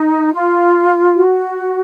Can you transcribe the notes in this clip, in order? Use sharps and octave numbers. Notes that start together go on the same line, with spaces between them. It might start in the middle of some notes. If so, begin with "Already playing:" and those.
Already playing: D#4
F4
F#4